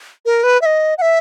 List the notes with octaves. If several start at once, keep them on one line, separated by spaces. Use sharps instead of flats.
A#4
B4
E5
D#5
F#5
E5